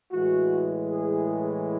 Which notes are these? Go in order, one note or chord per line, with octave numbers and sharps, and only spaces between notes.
A2 E3 G#3 F#4
G#4